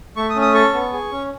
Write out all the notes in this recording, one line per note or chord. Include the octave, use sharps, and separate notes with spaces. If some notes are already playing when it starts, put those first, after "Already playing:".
A3 C#6
D#6
C#4
D#6
A4 C#6
B3
G#4
C#4